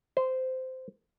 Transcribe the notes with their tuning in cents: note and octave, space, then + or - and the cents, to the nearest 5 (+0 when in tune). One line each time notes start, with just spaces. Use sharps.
C5 -15